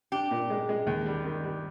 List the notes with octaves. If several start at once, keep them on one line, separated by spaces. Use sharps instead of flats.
D4 G4
A#2
G#3
G#3
D#2
G3
D#3
G3